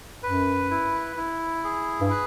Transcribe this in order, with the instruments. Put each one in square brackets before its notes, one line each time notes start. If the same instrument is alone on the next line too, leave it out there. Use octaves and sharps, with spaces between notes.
[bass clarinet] F#2 [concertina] B4
[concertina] E4
E4
G#4
[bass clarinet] G2
[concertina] B4